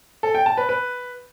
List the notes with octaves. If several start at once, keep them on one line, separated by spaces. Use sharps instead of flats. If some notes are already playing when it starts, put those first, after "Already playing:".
A4
G5
A5
B4
B4